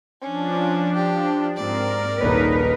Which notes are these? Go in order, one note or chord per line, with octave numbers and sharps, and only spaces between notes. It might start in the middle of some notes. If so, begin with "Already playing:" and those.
F3 C#4 D4
G4
G#2 C4 A#4 D5
D#1 A#1 D#4 B4 C#5